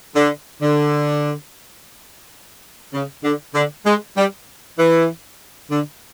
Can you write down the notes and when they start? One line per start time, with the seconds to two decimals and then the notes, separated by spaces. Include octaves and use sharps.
0.16 D3
0.62 D3
2.94 C#3
3.24 D3
3.55 D3
3.86 G#3
4.17 G3
4.79 E3
5.71 D3